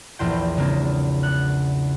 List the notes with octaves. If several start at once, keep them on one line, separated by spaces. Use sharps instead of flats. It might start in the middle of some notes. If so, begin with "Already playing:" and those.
A#1 E2 C5 G5
C#3 G#3 A#3 C4 D4
F#5 F#6